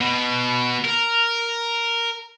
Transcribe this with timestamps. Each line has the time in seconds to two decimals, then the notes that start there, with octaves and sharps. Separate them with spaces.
0.01 B2
0.85 A#4